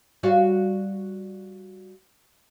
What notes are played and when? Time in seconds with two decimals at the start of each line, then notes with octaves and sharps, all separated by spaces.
0.23 G3 F#4 F5